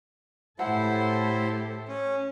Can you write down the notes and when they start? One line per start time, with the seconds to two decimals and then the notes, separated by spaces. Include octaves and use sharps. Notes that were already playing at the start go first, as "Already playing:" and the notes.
0.59 A2 E4 G4 A4 C5 F#5 A#5
1.88 C#4